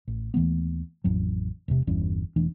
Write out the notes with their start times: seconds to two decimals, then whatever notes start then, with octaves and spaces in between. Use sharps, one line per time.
0.08 A1
0.34 D#2 E3 A3 B3
1.04 A1 F2 F#3
1.68 E1 C3
1.87 G1 E2 G3 C#4
2.36 E1 E3 A3 D4